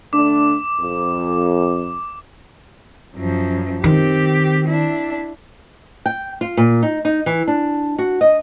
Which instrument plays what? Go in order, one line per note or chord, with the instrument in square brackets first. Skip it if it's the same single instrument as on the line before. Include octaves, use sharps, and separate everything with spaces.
[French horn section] D3 A3 D4 [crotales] D6
[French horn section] F2
[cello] F#2 F3
[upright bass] D#3 [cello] C4 G4
[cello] D4 E4
[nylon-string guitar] G5
F4
A#2
D#4
D#4
E3
D4
F#4
D#5